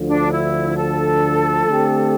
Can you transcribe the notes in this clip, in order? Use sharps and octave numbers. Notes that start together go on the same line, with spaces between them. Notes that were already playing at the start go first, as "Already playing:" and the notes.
Already playing: D2 D3 F3
D4
E4
A4
D3 A3 C4 G4